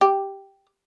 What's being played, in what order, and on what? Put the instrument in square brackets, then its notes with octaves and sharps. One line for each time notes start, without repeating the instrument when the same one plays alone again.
[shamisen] G4